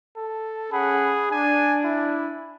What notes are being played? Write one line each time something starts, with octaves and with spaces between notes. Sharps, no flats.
A4
C#4 G#4 F#5 B5
D4 G#5
E4